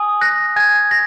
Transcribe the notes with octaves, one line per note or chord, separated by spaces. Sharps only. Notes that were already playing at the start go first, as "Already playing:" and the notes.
Already playing: G#5 D#6
F#6 A#6
G#5 G#6
A#6